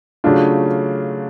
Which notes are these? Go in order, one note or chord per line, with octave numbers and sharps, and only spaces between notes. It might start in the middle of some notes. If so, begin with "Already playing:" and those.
C#3 F#3 A3 D4 F4